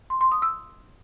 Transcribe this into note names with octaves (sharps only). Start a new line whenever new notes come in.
C6
C6
D#6
E6